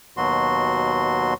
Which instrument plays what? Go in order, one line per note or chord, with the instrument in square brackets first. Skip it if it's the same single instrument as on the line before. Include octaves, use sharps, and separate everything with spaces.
[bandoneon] D#2 B2 F#3 F#4 C6